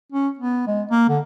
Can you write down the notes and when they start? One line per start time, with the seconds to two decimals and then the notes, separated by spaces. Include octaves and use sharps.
0.12 C#4
0.39 B3
0.67 G#3
0.91 A#3
1.09 D3